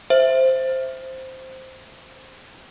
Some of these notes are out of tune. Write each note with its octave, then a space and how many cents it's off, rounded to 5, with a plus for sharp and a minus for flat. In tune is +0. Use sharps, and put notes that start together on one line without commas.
C5 +0 E5 +0